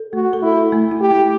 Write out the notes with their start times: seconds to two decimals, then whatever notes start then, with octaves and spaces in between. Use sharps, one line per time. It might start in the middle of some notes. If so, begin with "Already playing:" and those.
Already playing: A4
0.13 A3 F#4
0.33 A4
0.42 E4
0.52 A4
0.72 A3
0.91 E4
1.01 G4
1.11 A3